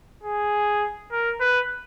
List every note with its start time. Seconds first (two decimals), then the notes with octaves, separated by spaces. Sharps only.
0.23 G#4
1.12 A#4
1.40 B4